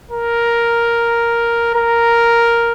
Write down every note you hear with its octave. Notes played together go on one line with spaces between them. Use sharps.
A#4
A#4